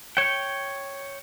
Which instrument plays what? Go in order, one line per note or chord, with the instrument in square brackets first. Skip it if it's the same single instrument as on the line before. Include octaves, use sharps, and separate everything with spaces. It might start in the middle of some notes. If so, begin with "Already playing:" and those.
[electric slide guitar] C#5 G5